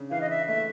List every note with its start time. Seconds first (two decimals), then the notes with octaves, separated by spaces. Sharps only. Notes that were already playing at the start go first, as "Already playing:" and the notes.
Already playing: C#3 D4
0.11 E3 F5
0.21 D#5
0.30 E5
0.48 A3 E5